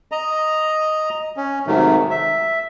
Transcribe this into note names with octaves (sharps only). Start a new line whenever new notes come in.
D#5 A#5
C#4
G#2 C3 D#3 F#3 A3
E5